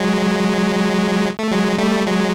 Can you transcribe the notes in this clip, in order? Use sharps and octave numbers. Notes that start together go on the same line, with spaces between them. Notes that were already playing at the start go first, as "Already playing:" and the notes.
Already playing: F#3 G#3
A3
F#3 G#3
G3 A3
F#3 G#3